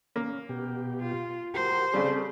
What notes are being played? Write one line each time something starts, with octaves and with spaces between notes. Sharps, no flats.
A#3 C#4
B2 G4
F4
F#4 G4 A#4 C5
C#3 G3 C4 A4